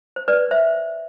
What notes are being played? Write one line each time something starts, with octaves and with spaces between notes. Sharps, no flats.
C5
B4 D5
C5 E5